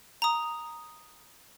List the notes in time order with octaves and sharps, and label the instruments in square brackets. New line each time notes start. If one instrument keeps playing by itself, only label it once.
[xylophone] A#5 D#6